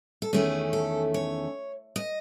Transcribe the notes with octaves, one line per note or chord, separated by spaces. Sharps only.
A4
E2 D#3 A3 C#4 G#4
A4
C#5
D#5